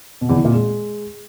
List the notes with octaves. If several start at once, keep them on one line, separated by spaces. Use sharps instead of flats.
B2
E2
E3
A#2
G#3